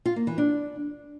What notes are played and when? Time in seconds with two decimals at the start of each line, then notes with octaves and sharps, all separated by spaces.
0.06 F4
0.16 A#3
0.27 E3
0.38 D4